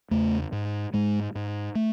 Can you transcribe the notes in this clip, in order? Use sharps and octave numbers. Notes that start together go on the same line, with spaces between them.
E2 C#3 A3
G#2
G#2 G#3
G#2
A3